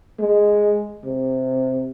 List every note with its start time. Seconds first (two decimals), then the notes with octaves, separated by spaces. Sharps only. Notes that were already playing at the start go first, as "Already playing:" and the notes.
0.19 G#3
1.05 C3